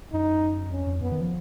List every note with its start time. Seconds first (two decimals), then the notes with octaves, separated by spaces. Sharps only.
0.13 F#2 D#4
0.71 F2 C#4
0.87 F2
1.01 F#2 B3
1.12 D#3
1.21 F3